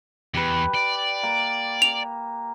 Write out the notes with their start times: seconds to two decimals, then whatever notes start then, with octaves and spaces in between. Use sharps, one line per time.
0.34 E2 G4 B4
0.75 D5
1.23 A#3
1.82 F7